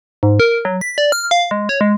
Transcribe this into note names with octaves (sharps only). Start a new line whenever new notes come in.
G#2
A#4
F#3
B6
D5
F6
F5
G#3
C#5
G#3